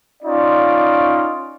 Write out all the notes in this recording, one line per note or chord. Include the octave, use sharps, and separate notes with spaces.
C#4 D#4 F4 D5